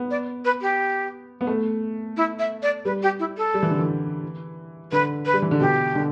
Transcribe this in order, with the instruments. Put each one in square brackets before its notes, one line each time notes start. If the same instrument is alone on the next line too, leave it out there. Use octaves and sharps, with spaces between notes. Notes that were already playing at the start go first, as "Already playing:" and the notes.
Already playing: [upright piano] B3
[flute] D5
B4
G4
[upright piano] B3
A3
[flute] E4
E5
D5
[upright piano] G3 [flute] B4
[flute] G4
E4
A4
[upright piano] G3
E3
D3
E3
[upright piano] D3 [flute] B4
[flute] B4
[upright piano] G3
E3
D3
[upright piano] B2 [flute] G4
[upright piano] D3